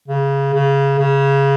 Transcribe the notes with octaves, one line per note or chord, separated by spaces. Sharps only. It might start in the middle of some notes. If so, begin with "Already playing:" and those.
C#3
C#3
C#3